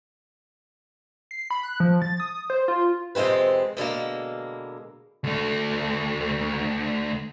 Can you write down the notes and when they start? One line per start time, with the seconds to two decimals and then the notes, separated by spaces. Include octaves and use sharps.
1.31 C7
1.51 B5
1.63 F#6
1.80 F3
2.02 A6
2.20 D#6
2.50 C5
2.68 F4
3.15 F2 C3 G#3 C4 B4
3.77 B2 D3 G#3 A#3
5.24 D2 A3